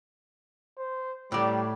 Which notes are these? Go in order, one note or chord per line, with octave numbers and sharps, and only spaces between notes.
C5
A2 G3 D5